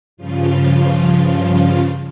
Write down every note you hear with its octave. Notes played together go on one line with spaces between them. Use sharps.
G2 C#3 F3 F4